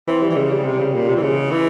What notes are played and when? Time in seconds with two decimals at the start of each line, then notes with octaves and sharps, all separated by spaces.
0.07 E3 C4
0.23 G3
0.30 E3
0.36 C#3 G#3
0.51 G3
0.65 C3
0.79 C#3
0.94 A#2
1.09 C3
1.16 E3
1.22 C#3 G#3
1.51 E3